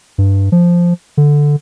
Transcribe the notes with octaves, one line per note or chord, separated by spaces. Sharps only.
G2
F3
D3